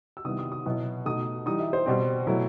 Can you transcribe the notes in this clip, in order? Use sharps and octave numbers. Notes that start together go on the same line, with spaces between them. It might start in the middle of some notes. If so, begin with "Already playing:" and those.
E6
C3 D#3 G3 B3 E4 D#6
D#6
D#6
B2 F#3 B3 E4
B2 A3 D#4 D#6
E3 G3 D#4 D#6
E5
C5
B2 G3 C4
B2 F#3 A3 E4